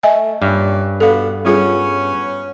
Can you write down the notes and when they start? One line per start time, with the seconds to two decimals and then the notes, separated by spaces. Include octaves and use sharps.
0.03 A3 D#5 E5 G#5
0.42 G2 A#2 C#4 D5
1.00 B2 B3 D4 A4 F5
1.45 G3 B3 C#4 F4 G#4